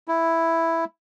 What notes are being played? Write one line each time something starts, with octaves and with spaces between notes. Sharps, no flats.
E4